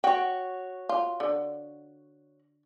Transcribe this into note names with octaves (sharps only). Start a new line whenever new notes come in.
F#4 C#5 G5
F4
D3